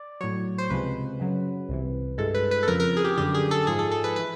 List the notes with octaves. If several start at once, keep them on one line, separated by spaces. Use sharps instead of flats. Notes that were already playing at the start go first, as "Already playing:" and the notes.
Already playing: D5
A2 F#3 C#5
C5
C#2 C3 F3 G#3 B4
F#2 C#3 F#3
C2 C3 E3
G2 E3 G#3 A4
B4
B4
A4
F2 C#3 F3 A#4
A#4
G#4
G4
F#2 D3 G3 G4
G#4
A4
G#2 F3 G#3 G#4
A4
A4
B4
E3 B4